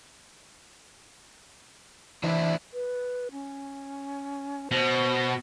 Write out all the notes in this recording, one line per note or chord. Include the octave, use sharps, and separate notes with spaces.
E3 D4 E4 C5 E5
B4
C#4
B2 C5